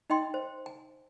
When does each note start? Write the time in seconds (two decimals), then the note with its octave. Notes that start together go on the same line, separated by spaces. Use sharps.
0.10 D#4 D#5 G5 C6
0.34 C5
0.66 G#5